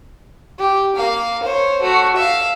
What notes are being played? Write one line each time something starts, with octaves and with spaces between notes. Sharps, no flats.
G4
A#3 F5
C5 C#5
A3 F#4
E5 F5